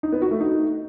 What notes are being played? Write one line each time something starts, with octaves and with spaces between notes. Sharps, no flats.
D#4
B3
F#4
A3
D#4